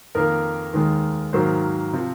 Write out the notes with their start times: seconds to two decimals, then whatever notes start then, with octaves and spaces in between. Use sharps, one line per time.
0.15 F2 D#3 A#3 A#4
0.73 D#2 D#3 G#3
1.33 G#2 D#3 F#3 A#3 C5
1.93 C3 F3